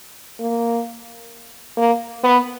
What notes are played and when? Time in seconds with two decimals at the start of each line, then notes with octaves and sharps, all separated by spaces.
0.40 A#3
1.77 A#3
2.23 B3